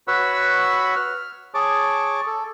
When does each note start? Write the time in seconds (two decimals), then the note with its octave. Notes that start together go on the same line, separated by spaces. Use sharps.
0.08 F#4 B4 C#5 F#5 B5 E6
0.96 F6
1.54 G#4 C#5 A5 D6
2.27 A4